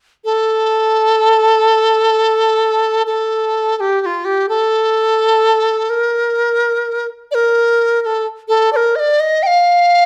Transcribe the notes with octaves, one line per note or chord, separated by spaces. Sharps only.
A4
A4
A4
G4
G4
F4
G4
A4
A#4
D5
A#4
A#4
A4
A4
D5
A#4
D#5
D5
D#5
G5
F5